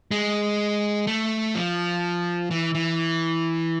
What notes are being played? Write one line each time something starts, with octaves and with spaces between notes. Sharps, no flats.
G#3
A3
F3
E3
E3